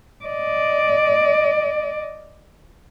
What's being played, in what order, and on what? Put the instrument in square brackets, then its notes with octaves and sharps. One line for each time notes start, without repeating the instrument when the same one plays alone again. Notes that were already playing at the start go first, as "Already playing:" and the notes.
[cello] D5 D#5